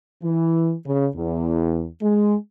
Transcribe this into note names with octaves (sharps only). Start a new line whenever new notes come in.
E3
C#3
E2
G#3